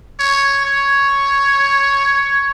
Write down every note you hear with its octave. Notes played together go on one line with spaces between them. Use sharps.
C#5
C#5